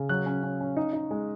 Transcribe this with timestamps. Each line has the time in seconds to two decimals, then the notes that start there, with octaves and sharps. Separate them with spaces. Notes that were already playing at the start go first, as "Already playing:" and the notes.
Already playing: C#3
0.09 F#3 F#6
0.26 C#4
0.43 C#4
0.61 C#4
0.77 D#4
0.93 D#4
1.11 G#3